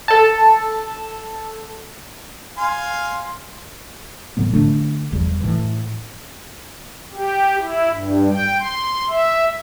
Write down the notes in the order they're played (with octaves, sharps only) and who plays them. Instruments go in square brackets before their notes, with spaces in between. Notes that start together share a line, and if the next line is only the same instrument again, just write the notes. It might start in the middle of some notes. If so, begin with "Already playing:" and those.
[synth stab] A4 A5
[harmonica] F5 G#5 C6
[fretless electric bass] A2 D#3 F#3 B3
D3 F3 A3 D4
F1 E2 F3 G3
A2 E3
[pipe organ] G4
E4
G2
G5
C6
E5